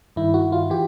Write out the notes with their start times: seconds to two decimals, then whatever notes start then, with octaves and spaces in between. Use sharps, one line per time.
0.16 G2 D#3 E4
0.34 F#4
0.52 F4
0.70 E3 G4